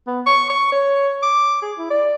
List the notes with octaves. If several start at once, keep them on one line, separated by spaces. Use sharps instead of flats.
B3
C#6
C#6
C#5
D6
G#4
E4
D5